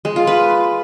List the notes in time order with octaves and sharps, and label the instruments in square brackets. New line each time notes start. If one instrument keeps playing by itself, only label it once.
[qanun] G#3
F4
B4